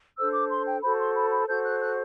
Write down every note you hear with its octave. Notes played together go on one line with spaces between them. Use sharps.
D4 A4 C5 E6
D6
C6
G5
F#4 A4 C5 B5
C6
B5
B5
F#4 A4 C5 G6
F#6
F#6